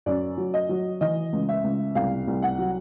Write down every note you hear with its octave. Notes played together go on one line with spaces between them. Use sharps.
F#2 D5
F#3
D#5
F#3
E3 D#5
C#2
E5
C#2
C2 F5
C2
F#5
F#3